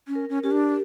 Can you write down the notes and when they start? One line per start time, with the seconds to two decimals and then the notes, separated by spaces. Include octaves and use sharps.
0.08 C#4
0.15 A#4
0.29 C#4
0.43 C#4 G4
0.51 D4